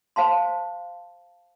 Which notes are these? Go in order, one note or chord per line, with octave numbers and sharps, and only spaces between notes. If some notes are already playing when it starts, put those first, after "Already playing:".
C5 F5 A5 C6